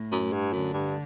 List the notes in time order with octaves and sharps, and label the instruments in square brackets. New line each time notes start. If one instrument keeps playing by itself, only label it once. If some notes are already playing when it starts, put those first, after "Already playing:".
Already playing: [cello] A2
[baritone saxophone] F#2
G2
[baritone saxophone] F#2 [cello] D3
[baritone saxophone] G2